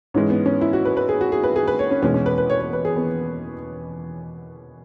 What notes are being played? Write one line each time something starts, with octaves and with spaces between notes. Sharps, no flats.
G#2 E3 G#3 C#4
B3
C#4
E4
F#4
B4
B4
G#4
F#4
G#4
B4
G#4
B4
C#5
C#4
E2 B2 G#3 C#4
C#4
B4
B4
C#5
C#5
B4
G#4
B3